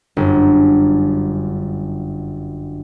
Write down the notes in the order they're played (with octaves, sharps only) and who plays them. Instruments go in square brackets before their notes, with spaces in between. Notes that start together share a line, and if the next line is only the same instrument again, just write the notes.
[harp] G1 F#2